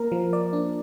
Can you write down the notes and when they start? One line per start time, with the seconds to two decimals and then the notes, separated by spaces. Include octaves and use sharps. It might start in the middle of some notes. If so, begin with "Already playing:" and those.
Already playing: A#3 A#4
0.12 F3
0.33 D5
0.53 D4